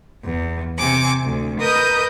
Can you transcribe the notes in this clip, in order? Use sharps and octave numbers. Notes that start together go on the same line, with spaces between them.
E2
C3 G#5 D6
D2
A#4 B4 D#5 D#6 G6